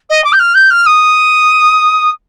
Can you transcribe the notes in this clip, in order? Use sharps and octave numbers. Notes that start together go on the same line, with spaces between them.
D#5
D6
G6
F6
G6
F6
D#6